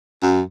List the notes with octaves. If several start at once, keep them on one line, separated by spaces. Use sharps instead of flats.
F#2